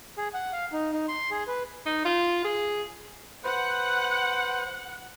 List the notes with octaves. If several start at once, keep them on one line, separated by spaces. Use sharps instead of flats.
G#4
F#5
F5
D#4
D#4
C6
G#4
B4
D#4
F4
G#4
B4 C5 F#5